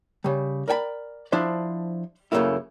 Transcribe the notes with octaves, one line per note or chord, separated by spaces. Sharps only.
C#3 G3
A#4 D5 G5 G#5 B5
F3 D4 E4 C5
F#2 C#3 E3 A3 A#3 E4